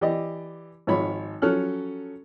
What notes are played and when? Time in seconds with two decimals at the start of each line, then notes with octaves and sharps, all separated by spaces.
0.01 E3 G4 D5 D#5
0.87 G#1 F3 G#3 C#5 B5
1.42 F3 F#3 C#4 A4 F6 F#6